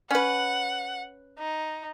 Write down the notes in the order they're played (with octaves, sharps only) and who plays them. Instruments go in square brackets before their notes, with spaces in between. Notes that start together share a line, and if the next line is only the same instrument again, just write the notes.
[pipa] C#4 B4 [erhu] F#5
[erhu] D#4